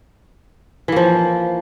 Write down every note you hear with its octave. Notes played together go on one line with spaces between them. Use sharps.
E3 F3 A#3